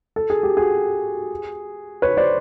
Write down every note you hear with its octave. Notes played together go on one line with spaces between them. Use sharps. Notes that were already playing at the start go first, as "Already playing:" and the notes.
A4
G#4
G4
F#4 G#4
B4 C#5
C5 D5